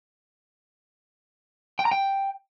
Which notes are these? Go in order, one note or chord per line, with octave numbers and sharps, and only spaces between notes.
G5
A#5
G5